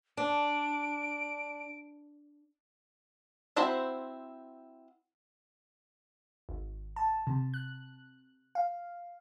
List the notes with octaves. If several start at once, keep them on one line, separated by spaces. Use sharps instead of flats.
D4 D7
C4 E4 F#4 C5 B5
G#1
A5
C3
F#6
F5